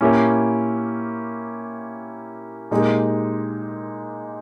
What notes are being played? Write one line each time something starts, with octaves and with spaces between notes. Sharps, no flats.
A#2 A#3 C#4 E4 G4
A#2 G#3 D#4 G4